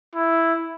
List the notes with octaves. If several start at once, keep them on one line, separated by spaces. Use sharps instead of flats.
E4